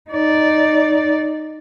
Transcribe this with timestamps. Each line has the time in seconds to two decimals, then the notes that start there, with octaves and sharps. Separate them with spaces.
0.11 D#4 D5